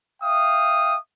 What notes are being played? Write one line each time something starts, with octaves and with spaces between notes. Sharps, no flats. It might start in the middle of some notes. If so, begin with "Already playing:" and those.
E5 F5 G5 D#6